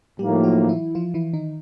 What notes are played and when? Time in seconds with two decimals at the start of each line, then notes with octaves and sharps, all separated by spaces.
0.18 A2 F3 G3 A#3 D#4 G4
0.44 F#3 F#4
0.69 E3 E4
0.95 F3 F4
1.14 E3 E4
1.33 D#3 D#4